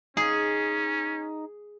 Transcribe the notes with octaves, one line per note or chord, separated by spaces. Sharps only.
C#4 D#4 G#4